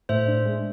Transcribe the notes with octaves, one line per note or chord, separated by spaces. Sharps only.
A2 C5 E5
D4
G#3